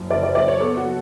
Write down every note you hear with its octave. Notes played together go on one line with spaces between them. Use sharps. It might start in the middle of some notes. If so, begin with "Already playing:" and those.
Already playing: F#1 F#2
F#1 D5
D5
F#1 D5
C#5
B3 A4
F#4
F#3